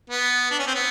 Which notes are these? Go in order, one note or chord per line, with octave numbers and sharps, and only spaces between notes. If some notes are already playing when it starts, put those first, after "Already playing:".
B3
D4
C#4
C4
B3